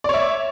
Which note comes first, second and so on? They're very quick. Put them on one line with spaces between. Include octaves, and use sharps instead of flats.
D5 C#5 E5